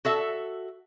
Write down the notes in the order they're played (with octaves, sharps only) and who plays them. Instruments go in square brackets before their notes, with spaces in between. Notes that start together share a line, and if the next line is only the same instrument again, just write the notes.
[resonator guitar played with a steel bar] F#4 A4 E5